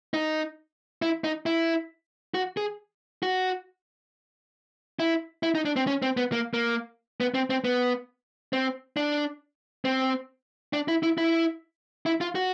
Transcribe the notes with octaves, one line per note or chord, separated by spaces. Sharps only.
D#4
E4
D#4
E4
F#4
G#4
F#4
E4
E4
D#4
D4
C4
C#4
C4
B3
A#3
A#3
B3
C4
C4
B3
C4
D4
C4
D4
E4
E4
E4
E4
F4
F#4